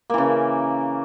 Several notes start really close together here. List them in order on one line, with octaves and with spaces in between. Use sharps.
A#3 E3 C#3